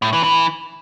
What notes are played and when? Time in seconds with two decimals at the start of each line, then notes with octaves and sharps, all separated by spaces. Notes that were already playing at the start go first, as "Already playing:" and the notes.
0.02 A2
0.13 E3
0.24 E3